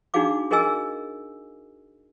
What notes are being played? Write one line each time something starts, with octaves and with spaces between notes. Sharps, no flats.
D4 D#4 F#4 G#4 F5 D6
F#4 G#4 A#4 D#5 G#5 E6